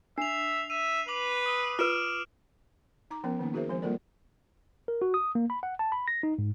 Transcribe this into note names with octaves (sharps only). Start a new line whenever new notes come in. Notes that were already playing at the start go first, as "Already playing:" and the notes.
D4 E5 C7 F7
E5 D#7
B4 D6 F#7
D#6 E6
F4 B4 F6 D7 E7
D#4 A#5 D6
F3 B3 C#4 A#4
D#3 A#3 C#4 D#4
D#4 F#4 G#4 A#4 C5 E5
F3 G#3 C4 C5
G3 A#3 F4 A4 A#4 D5
A#4
F#4
D#6
A#3
B5
F#5
A5
B5
A#6
D#4
G#2